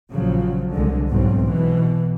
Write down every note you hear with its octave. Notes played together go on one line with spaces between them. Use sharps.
A#1 C#3 F3 F#3
C2 D3 G#3
B1 E2 G#2 F#3 C4
B2 E3